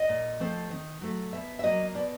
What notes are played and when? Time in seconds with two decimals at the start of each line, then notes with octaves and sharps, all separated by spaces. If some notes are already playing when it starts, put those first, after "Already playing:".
Already playing: D#5
0.09 A#2
0.40 F3 A3 C4
0.71 D#3
1.01 F#3 A3
1.33 B2 E5
1.59 E5
1.64 F#3 A#3 D#5
1.95 B2 D5